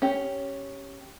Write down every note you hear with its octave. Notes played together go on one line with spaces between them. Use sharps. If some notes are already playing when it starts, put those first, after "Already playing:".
C#4 G4